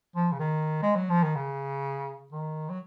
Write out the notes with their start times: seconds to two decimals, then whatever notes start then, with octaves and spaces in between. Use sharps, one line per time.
0.15 F3
0.32 C#3
0.39 D#3
0.82 G#3
0.96 F#3
1.10 F3
1.23 D#3
1.35 C#3
2.32 D#3
2.69 F#3